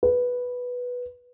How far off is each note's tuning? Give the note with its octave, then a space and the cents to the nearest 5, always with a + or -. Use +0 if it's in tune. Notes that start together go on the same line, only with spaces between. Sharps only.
B4 -5